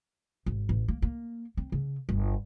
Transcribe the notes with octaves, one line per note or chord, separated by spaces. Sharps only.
G#1
A1
A#3
A#3
C4
C#3
G1